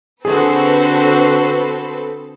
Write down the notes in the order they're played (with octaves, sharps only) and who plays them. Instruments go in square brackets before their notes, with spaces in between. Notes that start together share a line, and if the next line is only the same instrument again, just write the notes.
[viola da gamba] D3 F#4 C5 [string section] C4 A4 B4 [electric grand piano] G#4